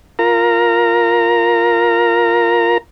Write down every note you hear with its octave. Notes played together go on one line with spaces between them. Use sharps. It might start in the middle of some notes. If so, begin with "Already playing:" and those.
F4 A#4 A#5